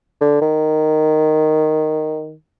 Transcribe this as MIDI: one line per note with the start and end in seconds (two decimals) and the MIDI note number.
0.21 0.39 50
0.41 2.34 51